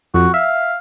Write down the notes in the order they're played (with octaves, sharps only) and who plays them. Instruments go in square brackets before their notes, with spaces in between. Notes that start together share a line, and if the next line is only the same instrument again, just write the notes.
[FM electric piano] F2 [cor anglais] F#4
[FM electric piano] E5 [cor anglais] F5